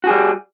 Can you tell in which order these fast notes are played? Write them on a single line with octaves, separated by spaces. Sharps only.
F#4 G#4 G3